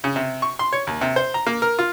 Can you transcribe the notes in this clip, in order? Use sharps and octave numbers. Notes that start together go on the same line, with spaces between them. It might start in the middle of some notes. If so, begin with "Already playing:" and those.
C#3
C3
C#6
C6
C#5
D#2
C3
C5
A#5
A#3
A#4
F4